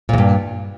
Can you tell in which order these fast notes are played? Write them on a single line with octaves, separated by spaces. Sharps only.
A#2 E2 G2